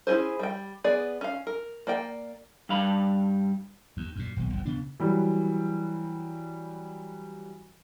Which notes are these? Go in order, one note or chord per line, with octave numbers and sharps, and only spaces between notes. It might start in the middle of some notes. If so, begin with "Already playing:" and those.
C#4 E4 F#4 G#4 C5
G3 G5
B3 G#4 D5
C#4 F5
A#4
A#3 D5 G5
G2 G3 F5 B5
D#2
F#2 A#2
D#1 B1
F#1 D#2
D2 C#3 B3 D4
E3 F#3 G3